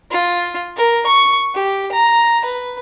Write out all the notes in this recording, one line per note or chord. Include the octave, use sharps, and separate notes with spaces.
F4
A#4
C#6
G4
A#5
B4